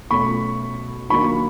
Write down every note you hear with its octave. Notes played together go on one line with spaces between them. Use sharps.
B2 F#3 A3 C#4 F4 B5 C#6
D#3 F#3 A#3 D4 B5 C#6